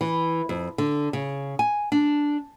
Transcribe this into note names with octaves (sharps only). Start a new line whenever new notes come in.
E3
F2
D3
C#3
G#5
D4